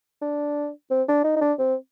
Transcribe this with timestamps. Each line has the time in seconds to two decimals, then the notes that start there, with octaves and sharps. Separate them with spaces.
0.22 D4
0.91 C4
1.08 D4
1.24 D#4
1.36 D#4
1.41 D4
1.59 C4